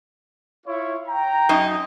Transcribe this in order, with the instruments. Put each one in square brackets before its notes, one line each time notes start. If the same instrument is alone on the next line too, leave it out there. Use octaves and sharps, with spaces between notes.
[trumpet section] E4 F4 C#5
G5 A#5
[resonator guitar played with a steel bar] F#2 D#4